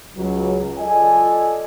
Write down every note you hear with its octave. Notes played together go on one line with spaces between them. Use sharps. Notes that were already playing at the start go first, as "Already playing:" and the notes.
C#2 F#3
F4 A4 D5 D#5 G#5